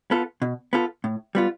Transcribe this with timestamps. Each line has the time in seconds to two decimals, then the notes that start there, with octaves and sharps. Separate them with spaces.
0.11 B3 F4 A4
0.42 B2
0.73 B3 F4 A4
1.04 A2
1.35 G3 B3 F4